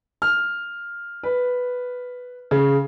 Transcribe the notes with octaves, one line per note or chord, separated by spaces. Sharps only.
F6
B4
C#3